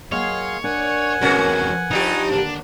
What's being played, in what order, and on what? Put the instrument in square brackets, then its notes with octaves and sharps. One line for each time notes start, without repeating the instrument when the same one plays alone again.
[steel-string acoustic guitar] F#3 A#3 D#5 [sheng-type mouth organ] G#4 F5 C6 [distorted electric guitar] C#5
[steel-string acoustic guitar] D4 A#4 D5 [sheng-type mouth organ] F#5 G#5
[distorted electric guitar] E2 C3 [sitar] G#3 C#4 F#4 [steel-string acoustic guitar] A#4 B4
[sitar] G2 F3 G4 [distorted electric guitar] D#4
[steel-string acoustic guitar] D#2 D3 A#5 [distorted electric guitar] D4